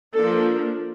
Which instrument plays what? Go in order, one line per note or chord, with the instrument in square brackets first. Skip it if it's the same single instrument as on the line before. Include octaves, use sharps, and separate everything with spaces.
[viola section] F3 A#3 D4 A4